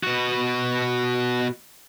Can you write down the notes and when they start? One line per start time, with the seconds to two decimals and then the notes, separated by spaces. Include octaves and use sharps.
0.03 B2 F#4